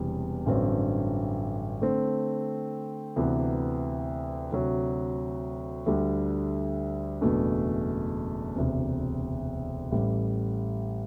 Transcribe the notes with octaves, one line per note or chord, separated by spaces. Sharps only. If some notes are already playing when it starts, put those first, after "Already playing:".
Already playing: E1 E2 C3 E3 G3
A1 G2 D3 F#3 C4
D3 A3 C4
D2 C3 E3 B3
D2 C3 F#3
D2 D3 G3
F#1 E2 B2 A3 D4
E1 D2 C3
A1 A2 G3